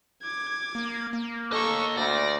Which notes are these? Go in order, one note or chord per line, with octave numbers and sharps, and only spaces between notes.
D6 G#6
A#3
A#3
A4 D#5 F5 C#6
D2 D5 A#6